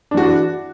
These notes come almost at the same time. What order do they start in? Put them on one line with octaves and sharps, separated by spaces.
D4 E3 F#4